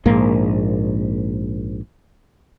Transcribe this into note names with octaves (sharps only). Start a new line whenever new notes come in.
A#1 G#2 A#3